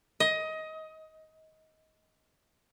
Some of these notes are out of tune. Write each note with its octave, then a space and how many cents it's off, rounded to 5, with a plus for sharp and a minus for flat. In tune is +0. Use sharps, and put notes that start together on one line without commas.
D#5 +20